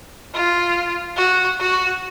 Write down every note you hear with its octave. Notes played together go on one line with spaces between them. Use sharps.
F4
F#4
F#4